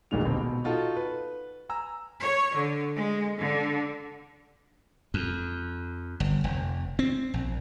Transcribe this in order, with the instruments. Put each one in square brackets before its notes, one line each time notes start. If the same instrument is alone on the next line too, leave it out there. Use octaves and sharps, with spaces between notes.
[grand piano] E1 D2 A#2 D3 D#3 F7
D#2 B2 C4
B2
D#4 F4 F#4 A4
B4
G#5 A#5 E6
[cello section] C#5
D3
G#3
D3
[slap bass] F2
G1
F1
C4
A#1